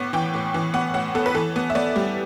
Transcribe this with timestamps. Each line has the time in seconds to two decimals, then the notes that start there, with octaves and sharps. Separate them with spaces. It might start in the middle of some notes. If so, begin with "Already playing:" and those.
Already playing: A2 B3 D6
0.13 E3 G5
0.34 A2
0.54 E3
0.74 B3 F#5
0.94 A2 F#5
1.15 B3 A4
1.26 B4
1.35 E3 A4
1.56 B3
1.70 E5
1.75 B3 D5
1.96 G3